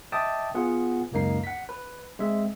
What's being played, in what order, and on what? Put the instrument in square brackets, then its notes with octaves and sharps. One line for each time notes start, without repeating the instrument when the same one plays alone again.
[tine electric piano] D#5 E5 G5 A5 D6 D#6
B3 F4 G#4 F#5
C#2 F#2 A#3 D#4 C7
F#5 B6
B4
G#3 C4 E5